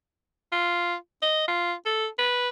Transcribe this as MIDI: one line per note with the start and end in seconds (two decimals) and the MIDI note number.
0.52 0.95 65
1.22 1.46 75
1.48 1.73 65
1.86 2.07 69
2.18 2.49 71